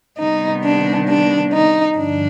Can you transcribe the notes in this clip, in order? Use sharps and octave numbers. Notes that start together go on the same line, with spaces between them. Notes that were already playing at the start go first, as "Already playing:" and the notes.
C3 D#3 G3 B3 D#4
D4
D4
D#4
G2 D3 F3 D4